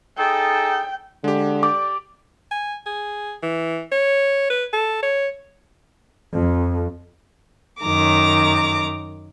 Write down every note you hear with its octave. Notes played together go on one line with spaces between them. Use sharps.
D#4 G#4 A4 G5
D3 G#3 G4
G4 D5 D6
G#5
G#4
E3
C#5
B4
A4
C#5
F2
F#2 D#3 A#5 D6